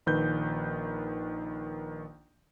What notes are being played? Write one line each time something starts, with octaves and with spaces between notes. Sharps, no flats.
A#1 D#3 B4 G6